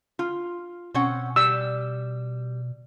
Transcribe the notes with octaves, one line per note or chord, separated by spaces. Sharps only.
F4
B2 C4 C#4 F#5
G3 E6